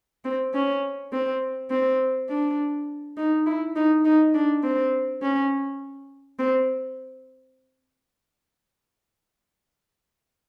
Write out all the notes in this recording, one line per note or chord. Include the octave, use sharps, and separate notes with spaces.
C4
C#4
C4
C4
D4
D#4
E4
D#4
D#4
D4
C4
C#4
C4